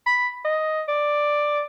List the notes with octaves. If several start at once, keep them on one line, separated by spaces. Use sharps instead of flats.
B5
D#5
D5